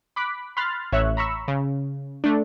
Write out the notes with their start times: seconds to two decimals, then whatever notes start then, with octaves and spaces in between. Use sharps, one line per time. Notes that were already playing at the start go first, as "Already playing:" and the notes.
0.16 B5 D6 F#6 B6
0.57 B5 C6 F6 F#6 A6
0.92 A1 C#5 E5 F#6
1.17 A#5 B5 C#6 E6
1.48 C#3
2.24 A3 D4